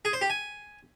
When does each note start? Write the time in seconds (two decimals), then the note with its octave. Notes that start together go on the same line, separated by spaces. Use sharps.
0.05 G#4
0.13 C5
0.21 G4
0.30 G#5